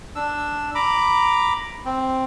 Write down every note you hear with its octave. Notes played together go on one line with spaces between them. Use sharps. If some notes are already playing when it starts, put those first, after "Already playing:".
D4 E6
A#5 B5 D6
C4